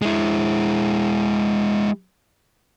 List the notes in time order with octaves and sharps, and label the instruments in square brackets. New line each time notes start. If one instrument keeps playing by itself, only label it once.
[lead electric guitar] G#3 E4